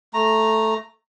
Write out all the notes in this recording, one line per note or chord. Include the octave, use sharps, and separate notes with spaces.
A3 A#5